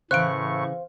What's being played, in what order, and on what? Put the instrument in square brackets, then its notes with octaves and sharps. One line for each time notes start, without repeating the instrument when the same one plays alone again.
[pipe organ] A2 C#6 [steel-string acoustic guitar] C#3 E3 [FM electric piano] C5 F5 [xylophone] F#6 D7